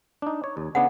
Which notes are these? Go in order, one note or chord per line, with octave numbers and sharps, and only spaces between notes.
D4 D#4
C#5
D#2
C#3 B3 D4 F#5